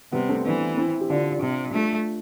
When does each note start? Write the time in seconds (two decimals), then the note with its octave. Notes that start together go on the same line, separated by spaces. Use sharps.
0.12 C3 G3 B3
0.29 A3 C4
0.45 E3 B3 D4
0.77 C4 E4
1.01 G4
1.09 D3 D4 F4
1.41 C3 D4 F4
1.73 A3 D4 F4